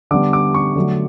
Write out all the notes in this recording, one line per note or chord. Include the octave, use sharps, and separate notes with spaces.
D3 G3 B3 D6
D6
C#6
D3 F#3 A3